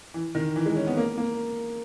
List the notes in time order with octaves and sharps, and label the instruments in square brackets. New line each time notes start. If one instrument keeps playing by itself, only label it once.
[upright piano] E3
D#3
E3
G#3
C#4
B3
A#3
A#3